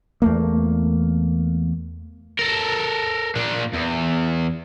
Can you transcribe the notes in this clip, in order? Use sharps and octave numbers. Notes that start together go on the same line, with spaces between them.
E2 A3 A#3
A4 A#4
A#2 D4
E2